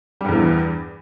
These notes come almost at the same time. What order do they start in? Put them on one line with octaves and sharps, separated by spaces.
G3 G2 E2 E3